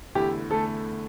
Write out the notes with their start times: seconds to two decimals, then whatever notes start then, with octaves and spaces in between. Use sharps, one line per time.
0.15 E2 D3 A3 E4 G4
0.49 E2 D3 A3 E4 A4